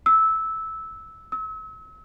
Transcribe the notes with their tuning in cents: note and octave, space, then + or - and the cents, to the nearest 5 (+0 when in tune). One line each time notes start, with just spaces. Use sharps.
E6 -10
E6 -35